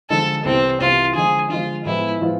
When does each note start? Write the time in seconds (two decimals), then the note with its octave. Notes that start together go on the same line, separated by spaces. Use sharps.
0.10 D3 F3 G#3 A4
0.45 C2 C3 E3 C4
0.80 C2 C3 E3 F4
1.15 D3 F3 G#3 G#4
1.50 D3 F3 G#3 F4
1.85 A2 F3 G#3 B3 E4 F4
2.21 A2 F3 G#3 B3 F4